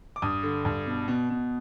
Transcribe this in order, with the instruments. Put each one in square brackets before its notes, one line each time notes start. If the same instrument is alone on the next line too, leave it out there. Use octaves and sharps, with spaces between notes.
[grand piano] D6
G2 D#6
D3
G2
B2
B2
B2